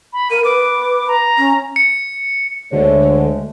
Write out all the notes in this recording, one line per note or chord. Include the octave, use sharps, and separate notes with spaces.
B5
A#4 D#7
B4 D6
A#5
C#4
C#7
D2 D3 G#3 A3 C#5